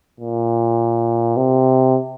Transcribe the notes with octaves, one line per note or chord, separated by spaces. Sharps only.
A#2
C3